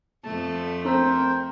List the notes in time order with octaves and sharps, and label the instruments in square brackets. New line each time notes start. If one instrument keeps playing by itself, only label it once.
[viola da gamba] F2 A3 [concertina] A5
[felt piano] C4 [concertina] A#4 C5 G5